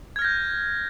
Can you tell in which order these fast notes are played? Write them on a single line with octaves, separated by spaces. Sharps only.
G#6 F6 A#6 G6